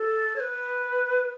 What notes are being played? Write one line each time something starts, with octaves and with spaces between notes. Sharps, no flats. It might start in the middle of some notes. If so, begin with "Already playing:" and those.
Already playing: A4
C#5
B4